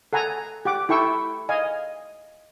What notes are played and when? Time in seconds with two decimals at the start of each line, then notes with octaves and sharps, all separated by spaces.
0.13 A4 F#5 G#5 A#5
0.65 G4 F#5 D6
0.89 E4 A4 G5 C#6 E6
1.49 D#5 F5 G#5